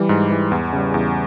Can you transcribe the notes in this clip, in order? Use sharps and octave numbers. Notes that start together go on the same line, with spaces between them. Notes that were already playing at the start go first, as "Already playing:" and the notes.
Already playing: E3 G3
G#2
E3 G3
E2
C#3 G3
E2